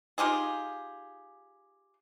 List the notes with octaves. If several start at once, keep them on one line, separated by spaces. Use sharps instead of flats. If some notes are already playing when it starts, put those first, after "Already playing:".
D#4 F4 G4 G#4